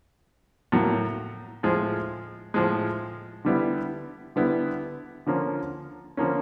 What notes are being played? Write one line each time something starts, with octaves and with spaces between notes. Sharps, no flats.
A2 F#3 A#3
A2 F3 G#3
A2 F3 G#3
D3 G3 B3 E4
D3 G3 B3 E4
D3 F3 A#3 C#4
D3 F3 A#3 C#4